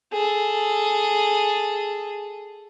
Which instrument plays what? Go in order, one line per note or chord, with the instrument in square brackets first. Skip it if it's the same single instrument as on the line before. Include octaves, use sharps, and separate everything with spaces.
[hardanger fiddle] G#4 A4